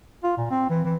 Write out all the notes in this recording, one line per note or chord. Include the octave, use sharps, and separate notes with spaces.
F4
A#2
C4
E3
E3